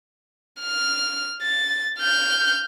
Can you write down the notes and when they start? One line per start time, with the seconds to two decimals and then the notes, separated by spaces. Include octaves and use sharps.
0.61 F6
1.42 A6
1.99 F6 G6